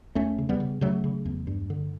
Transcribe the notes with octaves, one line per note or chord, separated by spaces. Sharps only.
E2 A3 C#4
C#3
G3 B3
C#3
C#3 F#3 A3
C#3
E2
G2
D3